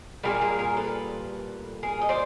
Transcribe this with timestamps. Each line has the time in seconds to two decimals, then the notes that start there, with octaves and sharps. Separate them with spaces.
0.23 A#2 G3 A#3 G#4 A#4
0.41 G#4 A#4
0.59 G#4 A#4
0.77 A4 B4
1.83 G#4 A#4
2.01 D#5
2.09 C5 D5